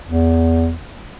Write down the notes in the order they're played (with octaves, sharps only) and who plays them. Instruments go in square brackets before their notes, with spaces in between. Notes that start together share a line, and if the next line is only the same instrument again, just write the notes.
[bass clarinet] E2